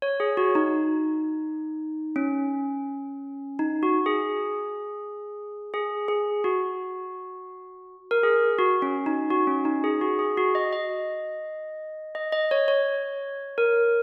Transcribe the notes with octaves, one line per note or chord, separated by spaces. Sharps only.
C#5
G#4
F#4
D#4
C#4
D#4
F#4
G#4
G#4
G#4
F#4
A#4
G#4
F#4
C#4
D#4
F#4
C#4
D#4
G#4
F#4
G#4
F#4
D#5
D#5
D#5
D#5
C#5
C#5
A#4